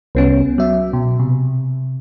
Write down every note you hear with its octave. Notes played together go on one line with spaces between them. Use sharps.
C2 B3 C#4
F#3 E5
B2
C3